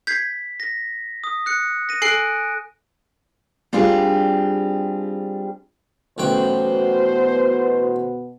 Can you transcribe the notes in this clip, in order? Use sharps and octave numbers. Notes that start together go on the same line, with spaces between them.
G6 G#6 B6 C7
A#6
D#6
F#6 C#7
A#6 D#7
A4 G#5 F#6 C7 D7
G3 C4 D4 F4 G4 G#4
A1 B2 F#3 B3 C5 G5